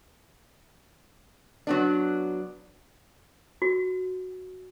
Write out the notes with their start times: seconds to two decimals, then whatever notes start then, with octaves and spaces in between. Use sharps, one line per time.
1.67 F#3 B3 D4
3.62 F#4